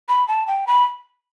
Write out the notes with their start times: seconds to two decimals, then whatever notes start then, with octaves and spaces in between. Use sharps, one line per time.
0.09 B5
0.28 A5
0.47 G5
0.67 B5